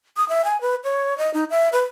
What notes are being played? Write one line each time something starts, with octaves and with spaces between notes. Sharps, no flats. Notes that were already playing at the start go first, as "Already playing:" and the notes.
D#6
E5
G#5
B4
C#5
D#5
D#4
E5
B4